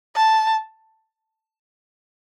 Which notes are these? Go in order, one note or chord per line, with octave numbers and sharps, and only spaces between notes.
A5